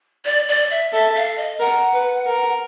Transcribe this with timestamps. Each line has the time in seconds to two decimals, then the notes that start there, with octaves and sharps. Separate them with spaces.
0.25 D5
0.48 D5
0.71 E5
0.92 A4 E5
1.15 F5
1.37 D#5
1.60 A#4 F#5
1.93 B4
2.26 A#4